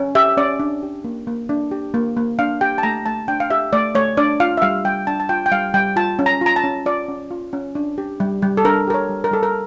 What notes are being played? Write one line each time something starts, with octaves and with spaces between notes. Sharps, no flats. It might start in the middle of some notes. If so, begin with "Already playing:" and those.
Already playing: C#4
G4 E5
C#4 D5
D4
G4
A#3
A#3
D4
G4
A#3
A#3
D4 F5
G4 G5
A5
A3 A#5
A3 A5
D4 G5
F5
G4 E5
A3 D5
A3 C#5
D4 D5
F4 F5
E5
G3 F5
G3 G5
D4 A5
A5
F4 G5
G5
G3 F5
G3 G5
F4 A5
C#4
A#5
F4 A#5
A5
C#4
F4 D5
C#4
F4
C#4
D4
G4
G3
G3
A4
D4 A#4
G4 A#4
C#5
G3
A#4
G3 A4
A#4